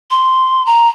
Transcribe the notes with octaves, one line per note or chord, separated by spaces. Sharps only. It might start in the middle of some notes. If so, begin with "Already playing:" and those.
C6
A#5